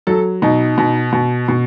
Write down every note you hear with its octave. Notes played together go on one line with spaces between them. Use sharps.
F#3 A4
B2 D#4
B2
B2
B2